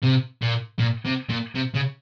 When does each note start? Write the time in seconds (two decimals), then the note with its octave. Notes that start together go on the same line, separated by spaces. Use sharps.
0.03 C3
0.42 A#2
0.79 A#2
1.05 C3
1.29 A#2
1.55 C3
1.74 C#3